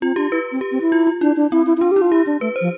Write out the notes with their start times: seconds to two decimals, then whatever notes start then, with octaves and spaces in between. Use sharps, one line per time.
0.02 C4 F4
0.16 D4 G4
0.31 E4 B4
0.52 C4
0.61 G4
0.72 C4
0.81 E4
0.92 F4
1.07 F4
1.21 D4 E4
1.36 D4
1.52 C4 E4
1.67 E4
1.77 E4
1.81 D4 F4
1.91 G4
1.96 E4
2.02 F4
2.11 E4 G4
2.27 D4
2.41 A3 B4
2.56 C5
2.61 F3